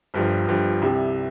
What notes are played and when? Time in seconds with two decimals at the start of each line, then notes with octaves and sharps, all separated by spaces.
0.14 G1 G2 F3
0.47 G1 G2 F3
0.82 C2 C3 G3